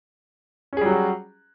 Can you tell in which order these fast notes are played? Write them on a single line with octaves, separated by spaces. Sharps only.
C#4 G#4 G3 F#3 F#4